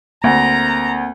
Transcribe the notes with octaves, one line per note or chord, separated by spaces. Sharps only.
D2 A#3 C4 A#5